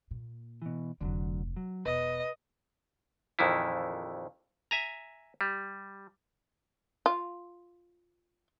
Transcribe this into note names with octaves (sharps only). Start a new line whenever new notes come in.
A#2
B2 E3
F1 D2 D3 F3 F#3
F#3
E1 B4 D#5
A#1 F2 D#3 E3 E4
E5 G#5 A#5
G3
F4